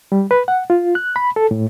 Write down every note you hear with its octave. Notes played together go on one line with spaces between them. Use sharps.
G3
B4
F#5
F4
F#6
B5
A4
A2